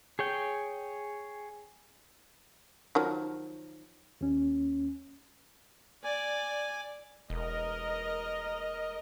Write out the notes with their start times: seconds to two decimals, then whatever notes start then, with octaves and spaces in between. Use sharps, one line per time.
0.19 G#4 C#5 G5
2.95 D#3 F3 F#3
4.21 D#2 C#4
6.04 D5 G#5
7.30 E1 A#4 D#5